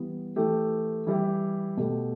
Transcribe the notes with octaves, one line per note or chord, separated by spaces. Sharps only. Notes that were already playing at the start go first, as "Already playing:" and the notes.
Already playing: E3 G3 B3
E3 A3 G4
E3 G3 E4 G4
B2 A3 G4